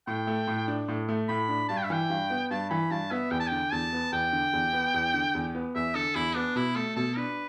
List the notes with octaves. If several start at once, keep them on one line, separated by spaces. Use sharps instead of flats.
A2 G5
A3
A2
D4
A2
A3
A2 B5
D4
G2 A5
G5
E5
E3 G5
G2
B3
G2 A5
E3 B5
G2 A5
B3 E5
E2 G5
A5
D3 G5
E2 A5
B3
E2 G5
D3
E2
B3
E2
D3
E2
B3
E2 E5
D3 A4
E2 E4
B3 D4
B2 E4
A3 A4
B2 A4
D4 B4